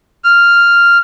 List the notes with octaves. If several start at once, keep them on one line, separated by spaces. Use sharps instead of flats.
F6